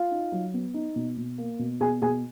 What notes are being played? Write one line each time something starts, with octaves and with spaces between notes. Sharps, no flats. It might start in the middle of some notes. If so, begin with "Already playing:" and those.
Already playing: F4 F5
D#4
F#3
B3
D#4
B2
B2
A#3
B2
B2 G#4 G#5
B2 G#4 G#5